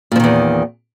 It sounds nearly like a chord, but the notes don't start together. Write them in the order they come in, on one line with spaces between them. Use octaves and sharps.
A#2 F3 D#3 E2